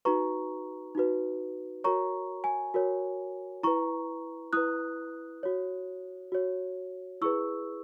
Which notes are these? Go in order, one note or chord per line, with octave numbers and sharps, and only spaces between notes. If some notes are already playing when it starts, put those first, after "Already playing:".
D#4 F#4 B4 A#5 C#6
D#4 F#4 B4
F#4 A#4 C#5 A#5 C#6
G#5
F#4 A#4 C#5
E4 B4 A#5 C#6
E4 B4 D#6 F#6
F#4 C#5
F#4 C#5
E4 G#4 B4 C#6 E6